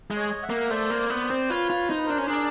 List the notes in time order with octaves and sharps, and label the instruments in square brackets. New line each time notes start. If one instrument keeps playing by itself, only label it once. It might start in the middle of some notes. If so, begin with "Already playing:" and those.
[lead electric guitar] G#3
[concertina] C#5 D#5
E5 F#5
[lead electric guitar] A#3
[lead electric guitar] A3 [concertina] C5 D5
[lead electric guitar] A#3
[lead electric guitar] B3 [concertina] C5 D5
[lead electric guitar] C4
[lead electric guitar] F4 [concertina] B4 C#5
[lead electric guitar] F4
[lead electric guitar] D#4 [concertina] C5
[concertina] B4
[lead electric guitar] D4 [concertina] A#4 C5
[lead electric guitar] C#4
[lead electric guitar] D4 [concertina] G#4 A#4